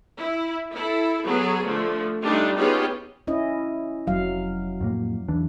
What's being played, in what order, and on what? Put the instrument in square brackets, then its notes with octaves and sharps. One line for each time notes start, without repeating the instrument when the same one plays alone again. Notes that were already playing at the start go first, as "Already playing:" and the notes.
[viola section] E4
E4 A4
F#3 B3 G#4 A4
D3 F3 A3
G3 A3 D4 D#4 F4 G4
B3 C#4 D#4 F4 G4 G#4
[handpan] C#4 E4 D#5
[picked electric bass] F1 [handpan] F#3 F5
[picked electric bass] F2 A2 A#3
E2 E3 D4